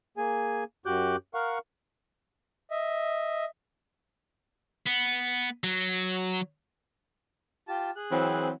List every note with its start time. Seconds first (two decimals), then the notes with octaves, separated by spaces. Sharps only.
0.18 A#3 G#4 G#5
0.86 F#2 F#4 G4 D6 F#6 G6
1.34 A#4 F5 F#5 C#6
2.70 D#5 E5
4.86 B3
5.64 F#3
7.67 F4 G4 A5
7.96 G#4 F#6
8.11 E3 F#3 C4